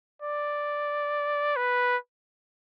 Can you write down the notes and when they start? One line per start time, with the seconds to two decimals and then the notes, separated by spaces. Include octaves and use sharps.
0.22 D5
1.56 B4